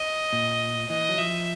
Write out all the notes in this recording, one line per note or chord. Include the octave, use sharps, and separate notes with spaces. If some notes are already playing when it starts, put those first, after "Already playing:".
Already playing: D#5
A#2
E3 D#5
F#3
F3 E5